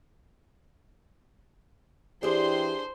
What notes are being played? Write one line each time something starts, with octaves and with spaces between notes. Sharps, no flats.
E3 D4 G4 G#4 C5 C6